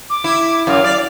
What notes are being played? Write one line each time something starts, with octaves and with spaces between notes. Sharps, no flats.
D6
E4
F#2 F5
D5